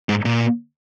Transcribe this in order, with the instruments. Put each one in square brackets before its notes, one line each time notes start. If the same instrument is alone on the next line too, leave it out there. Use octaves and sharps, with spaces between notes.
[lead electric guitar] G#2
A#2